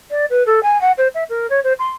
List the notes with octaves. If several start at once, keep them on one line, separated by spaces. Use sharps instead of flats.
D5
B4
A4
G#5
F#5
C5
E5
A#4
C#5
C5
C6